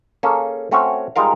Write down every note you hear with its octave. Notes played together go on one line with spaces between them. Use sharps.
A#3 C#4 G#4 A4
A3 C4 C#4 F#4 C#5
G3 G#3 D#4 F4 A#4 F5